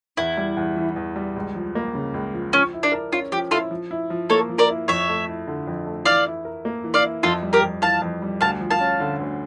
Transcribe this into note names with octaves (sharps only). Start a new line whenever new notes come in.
E2 E4
G3
E2
E3
E2
G3
C#2
F3
A#3
C#3
C#2
F3
F3 C#4
E4
D4
A#4
C#4 F4
F3 G4
E4 F4 A4
F3
E4
F3
A#3 A4 C#5
F3
A#4 D5
E4
F2 C#5 E5
A3
E4
D3
F2
A3
E3 D5 F5
E4
A#4
A#3
E3
D5 F5
E4
F2 F4 A4
G3
G4 A#4
F2
E3 F5 A5
F2
G3
D2 F5 A5
F3
F5 A5
C#4
D3
D2